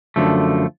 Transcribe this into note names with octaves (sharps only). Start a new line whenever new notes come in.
F#2 D3 F3 A3